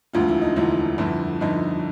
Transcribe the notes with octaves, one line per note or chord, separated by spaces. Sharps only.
E1 D2 D3 F3 F4
E4
D#4
E1 D2 D3 F3 E4
G1 F2 D3
G1 F2 D3 D#4